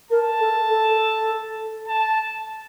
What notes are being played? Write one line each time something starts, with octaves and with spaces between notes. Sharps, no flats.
A#4 A5
A4
A4
A5